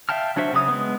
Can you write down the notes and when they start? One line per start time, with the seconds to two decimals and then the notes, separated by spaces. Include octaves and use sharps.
0.09 E5 F5 G5 A5 F6
0.36 F#3 D4 F#4 C5 E5
0.53 C#3 F#3 D#6
0.68 G#3 B3